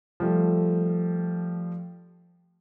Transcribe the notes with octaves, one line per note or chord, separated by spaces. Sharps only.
F3 G3 A3